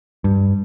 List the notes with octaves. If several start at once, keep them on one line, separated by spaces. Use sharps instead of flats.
G2